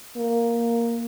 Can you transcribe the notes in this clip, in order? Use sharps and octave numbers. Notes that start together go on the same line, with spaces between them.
A#3